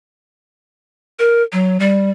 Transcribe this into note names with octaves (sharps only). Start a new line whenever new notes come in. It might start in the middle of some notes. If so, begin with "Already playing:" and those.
A#4
F#3
G3